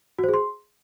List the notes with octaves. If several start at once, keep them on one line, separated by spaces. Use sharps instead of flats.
F#4
C5
G#4
C6